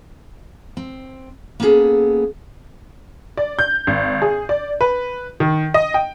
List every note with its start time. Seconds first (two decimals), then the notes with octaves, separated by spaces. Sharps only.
0.77 C4
1.60 A#3 B3 C#4 D4 G#4 A4
3.37 D5
3.59 G6
3.87 G#1
4.22 G#4
4.49 D5
4.81 B4
5.40 D#3
5.74 D#5
5.94 G5